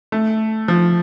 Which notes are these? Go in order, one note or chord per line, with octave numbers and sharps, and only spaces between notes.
A3
F3